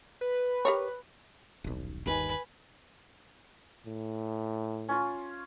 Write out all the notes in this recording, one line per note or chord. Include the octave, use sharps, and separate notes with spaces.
B4
G4 A#4 C#5
D#1 B1
G1 D#2 D#3 B4 G#5
A2
C#4 F4